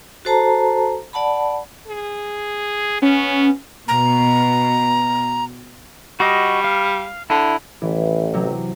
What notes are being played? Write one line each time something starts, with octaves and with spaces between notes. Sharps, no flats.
F#4 A4 C5 A5 A#5
D5 F#5 A5 B5
G#4
B3 C#4
B2 A#5
G3 F#4 D#5
F5
D3 E4
A1 E3
C3 F#3